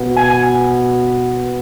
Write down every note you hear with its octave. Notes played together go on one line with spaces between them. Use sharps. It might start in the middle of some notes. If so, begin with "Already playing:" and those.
Already playing: B2 B3
G#5